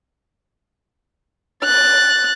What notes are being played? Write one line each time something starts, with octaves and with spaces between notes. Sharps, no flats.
F#6 A6